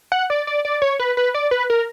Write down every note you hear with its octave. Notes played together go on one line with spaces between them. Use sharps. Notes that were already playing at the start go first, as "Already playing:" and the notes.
F#5
D5
D5
D5
C#5
B4
B4
D5
B4
A#4